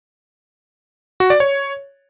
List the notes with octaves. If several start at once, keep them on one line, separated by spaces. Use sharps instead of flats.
F#4
D5
C#5